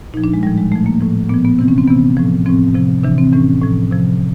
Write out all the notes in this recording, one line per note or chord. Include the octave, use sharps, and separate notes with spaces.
A#2 F3 D#4
D4
G#3
A2 F3 G3
G#3
A#2 F3 A3
A#3
A2 F3
A#2 F3 B3
B3
C3 E3 C4
C#4
C4
C3 E3 B3
A2 F3
A2 F3 C4
C3 F3
C3 E3 D4
C4
A2 E3 C#4
A2 F3
C3 F3